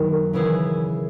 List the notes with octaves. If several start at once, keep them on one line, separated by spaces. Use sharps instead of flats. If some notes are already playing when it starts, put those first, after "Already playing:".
Already playing: F#2 D#3 A#3
C#3 E3 B3 E4 G#4